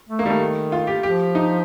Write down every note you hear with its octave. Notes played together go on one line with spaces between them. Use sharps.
A3
A#3
D#3 G3
A3
F4
G4
F3 G4
D#4